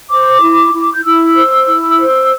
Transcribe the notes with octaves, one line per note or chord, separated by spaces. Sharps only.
C5 D6
E4
E4
G6
E4 E6
C5
E4
C5